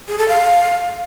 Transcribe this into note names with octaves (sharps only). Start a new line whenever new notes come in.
G#4
A4
F5